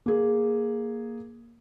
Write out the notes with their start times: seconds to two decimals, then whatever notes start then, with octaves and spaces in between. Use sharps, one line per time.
0.06 A#3 G#4